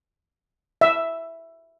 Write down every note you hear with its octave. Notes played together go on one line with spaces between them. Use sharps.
E5